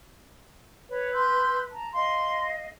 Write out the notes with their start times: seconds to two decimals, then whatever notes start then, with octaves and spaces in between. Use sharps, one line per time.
0.89 B4 C#5
1.13 C6 E6 G6
1.71 A5 A#5
1.93 D#5 F5 C6